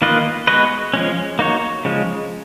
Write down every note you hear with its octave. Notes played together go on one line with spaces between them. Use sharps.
D#3 A#3 F4 B4 D#5
G#3 B3 F#4 B4 D#5
F3 G#3 C#4
A#3 D#4 F#4 C#5
C#3 F3 G#3